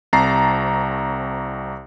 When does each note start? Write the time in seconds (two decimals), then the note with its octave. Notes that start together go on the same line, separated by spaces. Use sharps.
0.13 C2 C4 A5 A#5 A6 C7